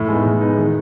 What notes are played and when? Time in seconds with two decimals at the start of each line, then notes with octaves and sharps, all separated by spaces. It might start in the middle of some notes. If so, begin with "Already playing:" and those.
Already playing: A2
0.09 G#3 B3 D#4
0.26 A2
0.41 G#3 B3 D#4
0.57 D#3